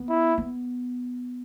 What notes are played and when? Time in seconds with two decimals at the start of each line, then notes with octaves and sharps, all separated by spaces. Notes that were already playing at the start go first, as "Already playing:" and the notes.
Already playing: B3
0.09 E4
0.38 B3